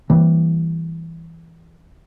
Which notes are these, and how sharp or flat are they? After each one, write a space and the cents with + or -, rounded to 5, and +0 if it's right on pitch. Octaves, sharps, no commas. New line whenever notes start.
E3 +0 G3 +0 A#3 +0